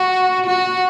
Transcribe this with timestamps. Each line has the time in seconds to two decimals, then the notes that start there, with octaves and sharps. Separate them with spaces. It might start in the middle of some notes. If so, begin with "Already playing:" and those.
Already playing: F#4
0.47 F#4